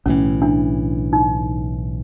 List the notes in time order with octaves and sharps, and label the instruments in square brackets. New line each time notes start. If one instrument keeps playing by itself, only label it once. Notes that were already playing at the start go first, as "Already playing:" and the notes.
[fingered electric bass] B1 A2 E3 [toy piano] C#4
[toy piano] D4
D#4